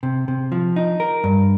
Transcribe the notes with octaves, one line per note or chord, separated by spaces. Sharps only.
C3
C3
F3
D#4
A#4
G2